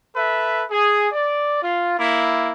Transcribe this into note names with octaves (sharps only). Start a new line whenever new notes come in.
A4 B4 E5
G#4
D5
F4
A#3 E4